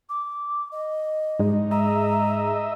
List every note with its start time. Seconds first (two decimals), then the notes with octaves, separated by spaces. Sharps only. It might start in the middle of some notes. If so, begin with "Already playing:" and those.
0.09 D6
0.72 D#5
1.39 G#2 G#3 D#4
1.71 D#5 E5 A#5